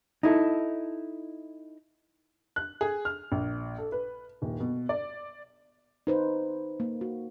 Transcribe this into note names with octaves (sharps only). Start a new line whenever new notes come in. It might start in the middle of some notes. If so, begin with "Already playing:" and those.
D#4 E4 A4
F#6
G#4
F6
A#1
A4
B4
D#1
B2
D5
D#4 B4 C5
A#3
F#4